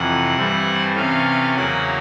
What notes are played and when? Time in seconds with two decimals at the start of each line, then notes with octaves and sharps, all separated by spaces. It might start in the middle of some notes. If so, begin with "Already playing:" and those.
Already playing: F2 C3 E3 F#5
0.36 G2 E3 A3 C4
0.95 C3 E3 A3 C#4 F5
1.56 E2 C#3 F#3 A#3 F#5